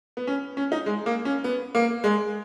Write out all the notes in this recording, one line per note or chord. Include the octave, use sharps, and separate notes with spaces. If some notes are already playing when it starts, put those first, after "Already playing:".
B3
C#4
C#4
D#4
G#3
A#3
C#4
B3
A#3
G#3